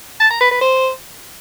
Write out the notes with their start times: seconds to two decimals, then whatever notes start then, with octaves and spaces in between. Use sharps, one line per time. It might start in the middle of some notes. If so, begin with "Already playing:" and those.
0.20 A5
0.30 A#5
0.41 B4
0.51 B4
0.61 C5